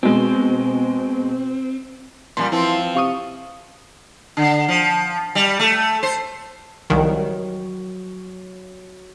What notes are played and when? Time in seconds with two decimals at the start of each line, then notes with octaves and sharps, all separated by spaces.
0.03 B2 G#3 C4
2.37 A#2 E3 G3 C6
2.52 E3 F3 C4
2.95 C3 F5 C#6 D#6
4.37 D3
4.69 F3
5.35 G3
5.60 A3
6.03 C5
6.90 C2 D#3 F#3